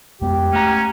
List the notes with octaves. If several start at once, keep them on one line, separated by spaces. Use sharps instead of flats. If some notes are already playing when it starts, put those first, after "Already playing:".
F2 G#3 B3 G4
A3 C#4 F5 F#5 A#5